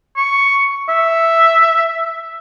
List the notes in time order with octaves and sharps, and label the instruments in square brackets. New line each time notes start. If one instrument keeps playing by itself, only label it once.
[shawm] C#6
E5